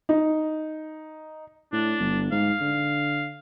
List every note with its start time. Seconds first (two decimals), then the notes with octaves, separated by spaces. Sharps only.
0.09 D#4
1.73 A2 D4
1.99 G1
2.32 G#2 F5
2.61 D3